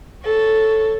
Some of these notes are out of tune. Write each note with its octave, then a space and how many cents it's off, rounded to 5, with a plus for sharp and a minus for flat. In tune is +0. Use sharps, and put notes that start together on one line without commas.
A4 +0 C#5 +0